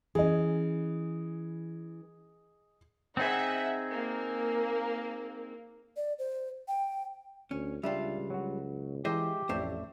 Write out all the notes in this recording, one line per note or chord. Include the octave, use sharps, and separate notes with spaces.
E3 C#4 G#4 D#5
C4 D#4 G#4 E5 F#5
A#3
D5
C5
G5
D2 C#4
C#2 G3 D4 F4 E5 G5
F#3 F#4
E3 G#3 F4 G4 C5 D#5 E5 A5
A1 F2 A3 C5 D5 E5